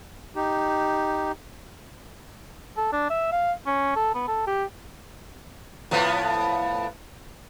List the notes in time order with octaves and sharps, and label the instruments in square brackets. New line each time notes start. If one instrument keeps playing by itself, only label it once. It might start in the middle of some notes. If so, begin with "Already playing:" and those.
[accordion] D#4 G4
[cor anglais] A4
D4
E5
F5
C#4
A4
B3
A4
G4
[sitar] A2 F3 B3